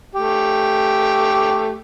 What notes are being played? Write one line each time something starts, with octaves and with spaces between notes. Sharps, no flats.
A3 G4